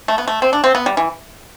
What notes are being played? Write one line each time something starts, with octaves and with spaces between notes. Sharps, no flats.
A3
B3
A3
C4
D4
C4
B3
G3
E3